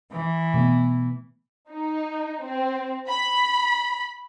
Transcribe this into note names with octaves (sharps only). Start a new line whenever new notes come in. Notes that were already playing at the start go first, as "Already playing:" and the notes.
E3
B2 A3 B3
D#4
C4
B5